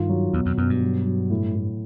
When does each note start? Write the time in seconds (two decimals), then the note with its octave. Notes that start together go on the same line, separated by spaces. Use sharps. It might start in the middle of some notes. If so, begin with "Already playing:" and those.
Already playing: G2 D#3 F4
0.09 F#3
0.33 E2 B2
0.46 F2
0.58 F#2 B2
0.69 G2
0.81 F#3
1.06 F#3
1.30 A2
1.55 A2